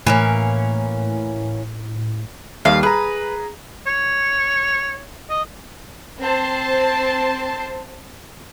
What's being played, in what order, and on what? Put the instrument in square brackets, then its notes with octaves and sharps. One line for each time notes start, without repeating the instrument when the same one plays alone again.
[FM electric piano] A2 [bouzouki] E3 A#3 C#4
[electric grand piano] D#2 G3 [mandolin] F5
[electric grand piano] G#4 A#5 [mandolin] B4
[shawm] C#5
D#5
[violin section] C4 C5 A5 C6